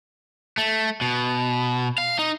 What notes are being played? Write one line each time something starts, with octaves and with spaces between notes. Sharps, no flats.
A3
B2
F5
D#4